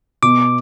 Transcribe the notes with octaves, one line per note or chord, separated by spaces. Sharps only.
B2 D6